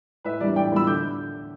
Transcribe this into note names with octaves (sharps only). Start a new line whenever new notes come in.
A2 B4 E5
E3 G3 B3 D4 D5
A2 D5 G5
E3 G3 B3 D4 B5 E6
D3 D6 G6